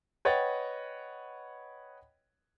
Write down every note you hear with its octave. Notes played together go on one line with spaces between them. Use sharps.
B4 C#5 D#5 F#5 G5 A6